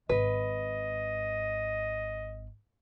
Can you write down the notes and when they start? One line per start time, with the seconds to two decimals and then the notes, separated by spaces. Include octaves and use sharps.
0.09 G#1 B4 D#5